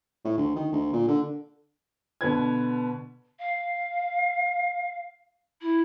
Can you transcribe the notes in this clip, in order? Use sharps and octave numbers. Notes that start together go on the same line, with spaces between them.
A2
D2
D#3
D2
A#2
D3
B2 D3 B4 G#6
F5
E4